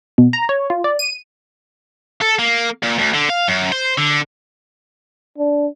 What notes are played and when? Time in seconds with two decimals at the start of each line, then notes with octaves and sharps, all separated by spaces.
0.18 B2
0.33 A#5
0.49 C#5
0.70 F4
0.84 D5
0.99 D#7
2.21 A4
2.39 A#3
2.83 A#2
2.99 D2
3.14 D3
3.30 F5
3.48 F#2
3.72 C5
3.98 D3
5.38 D4